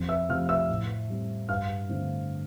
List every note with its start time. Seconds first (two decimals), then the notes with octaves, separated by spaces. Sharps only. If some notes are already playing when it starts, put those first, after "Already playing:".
Already playing: F2
0.09 E5 E6
0.29 C3 F3 A3 F5 F6
0.49 E5 E6
0.70 A2
1.10 G3 C4
1.49 G2 F5 F6
1.89 D3 A3 C4